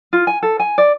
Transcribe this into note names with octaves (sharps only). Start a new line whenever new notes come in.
F4
G#5
A4
G#5
D5